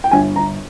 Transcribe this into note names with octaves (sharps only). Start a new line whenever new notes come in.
G5
G1 G#5
G1 A#5